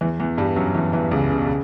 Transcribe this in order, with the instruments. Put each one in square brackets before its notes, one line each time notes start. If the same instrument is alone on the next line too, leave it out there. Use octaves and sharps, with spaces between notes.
[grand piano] E2 E3
E2 E3
G2 G3
F#2 F#3
E2 E3
E2 E3
C#2 C#3
C#3
B2
C#3